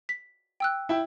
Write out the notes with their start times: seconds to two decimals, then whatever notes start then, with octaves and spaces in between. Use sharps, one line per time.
0.09 B6
0.60 G5 E6 F#6
0.89 E4 E5 G5